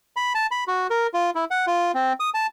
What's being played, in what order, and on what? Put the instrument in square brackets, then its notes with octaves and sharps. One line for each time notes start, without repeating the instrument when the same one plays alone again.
[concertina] B5
A5
B5
F#4
A#4
F4
E4
F#5
F4
C4
D#6
A5